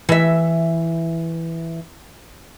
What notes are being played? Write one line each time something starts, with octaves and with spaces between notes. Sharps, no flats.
E3 E5